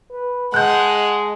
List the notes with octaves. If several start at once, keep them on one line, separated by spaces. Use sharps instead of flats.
B4
G#3 F#5 A5 F#6 G6